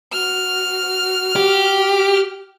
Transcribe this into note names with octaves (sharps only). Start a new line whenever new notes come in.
F#4 F6
G4